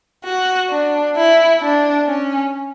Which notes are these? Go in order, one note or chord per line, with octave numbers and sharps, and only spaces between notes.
F#4
D4
E4
D4
C#4